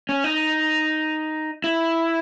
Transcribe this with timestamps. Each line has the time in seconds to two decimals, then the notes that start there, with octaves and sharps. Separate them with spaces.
0.09 C#4
0.24 D#4
1.64 E4